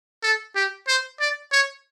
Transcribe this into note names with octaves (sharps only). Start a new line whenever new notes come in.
A4
G4
C5
D5
C#5